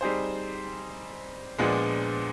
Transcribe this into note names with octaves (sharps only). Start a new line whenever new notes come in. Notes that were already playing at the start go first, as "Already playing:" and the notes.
G3 C4 D#4 G#4 C5
A#2 F3 G#3 B3 D4